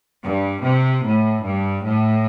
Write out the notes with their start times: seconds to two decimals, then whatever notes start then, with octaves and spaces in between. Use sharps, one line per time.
0.23 G2
0.64 C3
1.05 A2
1.45 G2
1.87 A2